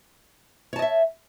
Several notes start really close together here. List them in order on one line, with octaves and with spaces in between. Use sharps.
C#5 A5 D#5 E5